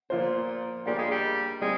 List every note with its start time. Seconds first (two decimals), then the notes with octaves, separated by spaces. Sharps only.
0.10 A#2 F3 A#3 F4 C5
0.86 G3 A#3 D4 F4 G#4
0.98 G#3
1.11 G3
1.62 G3 G#3 C4